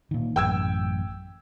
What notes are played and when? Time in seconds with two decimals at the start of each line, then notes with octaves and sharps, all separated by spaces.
0.11 A#2 D#3
0.36 A1 F#2 G5 E6 G#6